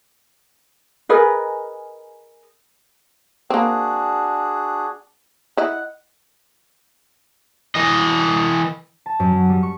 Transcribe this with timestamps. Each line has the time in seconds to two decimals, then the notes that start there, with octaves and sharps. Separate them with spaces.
1.09 G#4 A#4 B4 D#5
3.50 A#3 C4 D4 F#4 G#4
5.57 E4 D#5 F#5
7.75 E3 D#5
9.06 A5
9.20 F#2
9.32 F#3
9.49 G3
9.63 C#6